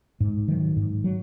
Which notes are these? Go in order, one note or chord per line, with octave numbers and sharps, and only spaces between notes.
G#2
D#3 F#3
G#2
F#3